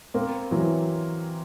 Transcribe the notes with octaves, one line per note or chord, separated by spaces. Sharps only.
A#3 C4
E3 F#3